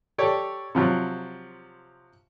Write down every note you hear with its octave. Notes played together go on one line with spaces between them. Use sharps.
G4 A4 C#5 D5
C3 F3 F#3